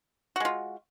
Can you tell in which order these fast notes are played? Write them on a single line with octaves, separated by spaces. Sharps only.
F#4 G#3 F4